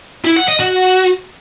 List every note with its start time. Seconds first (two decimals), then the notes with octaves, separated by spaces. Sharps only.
0.25 E4
0.36 F#5
0.48 D#5
0.60 F#4